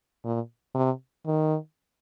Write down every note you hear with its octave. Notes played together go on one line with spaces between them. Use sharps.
A#2
C3
D#3